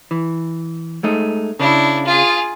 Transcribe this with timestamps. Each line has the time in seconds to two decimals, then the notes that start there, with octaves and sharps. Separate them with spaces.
0.11 E3
1.03 G#3 A3 D#4
1.60 C#3 D4 E4
2.05 F4 G#4